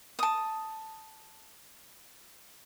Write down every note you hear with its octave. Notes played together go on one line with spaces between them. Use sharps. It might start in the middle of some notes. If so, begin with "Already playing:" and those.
A5 D#6